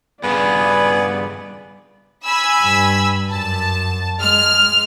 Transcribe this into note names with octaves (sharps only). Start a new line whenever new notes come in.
G2 C#3 B3 G#4 D5
G#5 B5 E6
G2
F#2 A5
G#3 F6